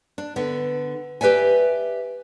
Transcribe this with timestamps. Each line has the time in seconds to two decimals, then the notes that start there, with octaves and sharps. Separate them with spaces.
0.18 D4
0.36 D3 B3
1.21 G4 B4 D5 E5 G#5